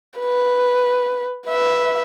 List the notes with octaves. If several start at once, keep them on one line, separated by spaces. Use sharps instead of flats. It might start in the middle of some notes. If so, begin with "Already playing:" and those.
B4
B4 E5